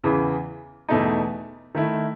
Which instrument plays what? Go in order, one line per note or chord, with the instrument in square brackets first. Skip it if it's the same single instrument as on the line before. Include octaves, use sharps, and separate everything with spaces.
[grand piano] E2 C#3 E3
E2 B2 A3 D#4
D#3 A3 E4